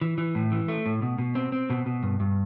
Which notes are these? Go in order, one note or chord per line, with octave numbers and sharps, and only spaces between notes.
E3
E3
A2
E3
A3
A2
B2
B2
C4
C4
B2
B2
G2
G2